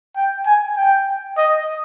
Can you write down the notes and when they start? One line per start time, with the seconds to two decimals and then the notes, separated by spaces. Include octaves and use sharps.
0.16 G5
0.46 G#5
0.77 G5
1.38 D#5